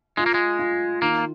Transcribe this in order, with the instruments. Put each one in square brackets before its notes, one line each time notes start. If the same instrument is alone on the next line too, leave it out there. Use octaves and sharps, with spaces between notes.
[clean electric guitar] G#3 [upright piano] F4
[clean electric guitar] A#3
G#3
[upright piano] F4
[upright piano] D#3 [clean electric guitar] A#3